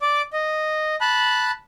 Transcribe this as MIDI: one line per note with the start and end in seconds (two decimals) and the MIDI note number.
0.02 0.22 74
0.02 0.22 86
0.33 0.96 75
1.01 1.51 81
1.01 1.51 83
1.01 1.51 90